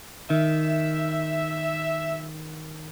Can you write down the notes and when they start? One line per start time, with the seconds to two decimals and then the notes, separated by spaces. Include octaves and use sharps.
0.30 D#3 E5